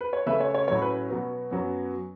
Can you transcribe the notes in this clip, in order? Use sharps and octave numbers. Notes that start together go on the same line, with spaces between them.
B4
C#5
C#3 A3 C#4 B4 E5
C#5
C#5
A2 F#3 C#4 C#5
B4
B2 F#3 B3
F#2 F#3 B3